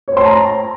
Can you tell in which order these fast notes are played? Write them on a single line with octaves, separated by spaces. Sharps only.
C#5 C5 C6 A5 A#5